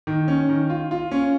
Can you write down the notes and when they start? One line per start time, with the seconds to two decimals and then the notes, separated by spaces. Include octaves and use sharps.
0.07 D#3
0.28 C#4
0.49 D#3
0.70 F4
0.91 F4
1.11 C#4